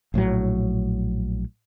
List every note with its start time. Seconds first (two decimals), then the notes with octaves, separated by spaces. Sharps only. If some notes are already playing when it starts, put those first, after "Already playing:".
0.14 A#1 A2 C3 F#3